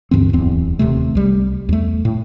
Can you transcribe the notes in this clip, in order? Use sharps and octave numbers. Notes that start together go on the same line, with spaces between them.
D2 G2 E3 C4
D1 E2 C4
D#1 G#1 C3 A3
C2 G3
E2 A3
A2